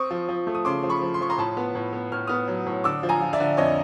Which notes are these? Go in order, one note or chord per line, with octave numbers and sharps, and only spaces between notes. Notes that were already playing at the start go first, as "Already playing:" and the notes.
Already playing: C4 C#6 D#6
F3
F3
A3
D#6
C#3 C6 D6
F3
B5 C#6
F3
C6
F3 C#6
A#5 C6
A2 A5 B5
B3
A2
B3
A2 F6
B3 D#6 F6
F#3
A2
D3 D6 E6
F3
G#5 A#5
F3
D5 E5
D3
F2 C#5 D#5